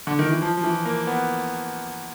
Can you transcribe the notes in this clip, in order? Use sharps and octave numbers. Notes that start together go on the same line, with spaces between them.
D3
D#3
E3
F3
F3
E3
A#3
B3